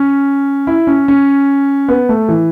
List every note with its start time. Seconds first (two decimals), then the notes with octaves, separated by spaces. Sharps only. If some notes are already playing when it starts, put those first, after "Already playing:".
Already playing: C#4
0.67 E4
0.87 C#4
1.08 C#4
1.88 B3
2.09 A3
2.28 E3